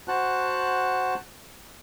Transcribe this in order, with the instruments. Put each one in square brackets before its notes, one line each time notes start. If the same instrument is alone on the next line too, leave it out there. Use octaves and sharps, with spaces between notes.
[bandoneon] F#4 C5 F#5 A5 F#6